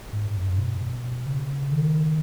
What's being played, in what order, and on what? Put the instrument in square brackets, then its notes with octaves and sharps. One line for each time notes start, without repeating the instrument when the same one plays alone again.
[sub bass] G#2
G#2
F#2
B2
B2
C#3
D#3